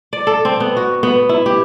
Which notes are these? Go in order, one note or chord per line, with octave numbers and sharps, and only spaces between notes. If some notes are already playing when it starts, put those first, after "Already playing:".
D5
A4
C4
B3
F#4
B3
E4
G4